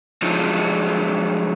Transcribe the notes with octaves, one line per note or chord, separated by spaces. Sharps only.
F3 F#3 G#3 D4 D#4 F4